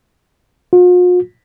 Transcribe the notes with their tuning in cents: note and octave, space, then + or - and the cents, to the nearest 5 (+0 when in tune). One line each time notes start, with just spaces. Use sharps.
F4 +45